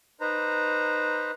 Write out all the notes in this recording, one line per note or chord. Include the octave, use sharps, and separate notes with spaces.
D#4 B4 C5 A#5